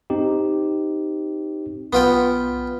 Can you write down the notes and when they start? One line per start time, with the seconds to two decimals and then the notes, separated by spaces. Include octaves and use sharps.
0.10 C4 D#4 G4
1.93 B1 B3 F4 G5